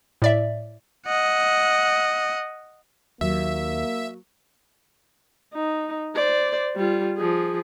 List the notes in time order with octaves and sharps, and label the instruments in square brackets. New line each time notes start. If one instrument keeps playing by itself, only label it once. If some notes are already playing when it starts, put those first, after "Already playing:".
[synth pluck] A2 D5 E5
[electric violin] D#5 F#5
[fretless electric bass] D#2 [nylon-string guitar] F#3 [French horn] A#3 [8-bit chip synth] E5
[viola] D#4
C5 D5
G3 F4
F3 G#4